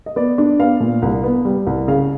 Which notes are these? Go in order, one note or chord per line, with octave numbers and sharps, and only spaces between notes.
D#5
B3 D5
D4
B3 F5
A#2
C2
B3
G3
C2
C#3 F5